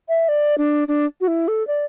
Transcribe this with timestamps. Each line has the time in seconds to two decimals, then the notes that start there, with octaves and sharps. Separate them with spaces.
0.09 E5
0.28 D5
0.58 D4
0.88 D4
1.21 F#4
1.28 E4
1.48 A4
1.67 D5